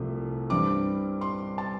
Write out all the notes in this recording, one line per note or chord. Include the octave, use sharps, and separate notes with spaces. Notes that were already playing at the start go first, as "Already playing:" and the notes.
Already playing: C2 C3 F3 A3
G2 G3 C4 D6
C6
A5